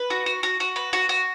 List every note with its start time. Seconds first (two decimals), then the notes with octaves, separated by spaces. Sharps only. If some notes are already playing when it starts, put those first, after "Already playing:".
Already playing: B4
0.10 F#4
0.26 F#4
0.43 F#4
0.60 F#4
0.76 B4
0.93 F#4
1.09 F#4